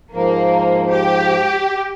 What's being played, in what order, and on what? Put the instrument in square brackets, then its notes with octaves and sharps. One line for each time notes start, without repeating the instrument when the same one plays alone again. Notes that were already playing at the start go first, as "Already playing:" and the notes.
[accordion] G#2 F3 [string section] A#3
[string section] G4